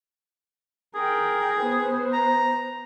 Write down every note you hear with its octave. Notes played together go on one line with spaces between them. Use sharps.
G#4 A#4 G5
B3 C5
A#5